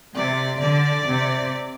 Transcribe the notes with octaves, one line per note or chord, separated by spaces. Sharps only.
C3 D5
D3 D5
C3